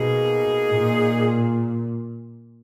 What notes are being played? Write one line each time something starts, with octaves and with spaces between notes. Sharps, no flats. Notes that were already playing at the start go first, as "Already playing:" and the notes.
Already playing: B2 A#3 D#4 G#4
A#2